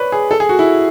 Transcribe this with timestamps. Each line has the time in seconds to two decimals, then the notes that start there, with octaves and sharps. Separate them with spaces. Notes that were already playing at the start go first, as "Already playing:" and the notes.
Already playing: B4 C#5 D5
0.12 G#4
0.31 A4
0.40 G#4
0.49 F#4
0.59 E4